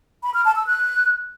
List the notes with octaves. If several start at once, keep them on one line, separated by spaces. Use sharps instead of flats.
B5
F6
A5
E6
F#6